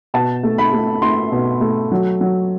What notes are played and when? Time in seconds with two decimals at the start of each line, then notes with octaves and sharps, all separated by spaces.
0.14 B2 A5
0.43 A3
0.58 B5
0.73 A3
1.02 A3 C6
1.32 B2
1.61 A3
1.92 F#3
2.21 F#3